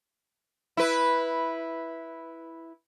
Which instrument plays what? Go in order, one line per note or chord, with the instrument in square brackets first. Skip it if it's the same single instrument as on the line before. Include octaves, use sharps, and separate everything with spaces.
[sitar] E4 B4